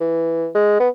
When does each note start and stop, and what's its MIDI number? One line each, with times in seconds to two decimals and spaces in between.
0.01 0.48 52
0.55 0.79 56
0.80 0.89 59